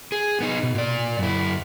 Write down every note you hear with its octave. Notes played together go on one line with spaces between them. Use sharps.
G#4
B3 D#4
B2
A#2 D5
F#2 E4